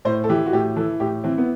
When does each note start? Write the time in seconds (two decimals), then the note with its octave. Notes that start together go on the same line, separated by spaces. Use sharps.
0.05 A2 C5
0.24 A4
0.29 E3 G4
0.46 F#4
0.53 A2 G4
0.76 E3 A4
1.00 A2 G4
1.24 E3 C4
1.38 B3